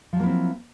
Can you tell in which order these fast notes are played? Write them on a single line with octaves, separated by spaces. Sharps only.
F3 F#3 A#3 E4 C4